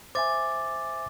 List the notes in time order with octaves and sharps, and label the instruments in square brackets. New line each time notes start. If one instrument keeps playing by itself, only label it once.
[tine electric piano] C5 E5 G#5 [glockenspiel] D6 A6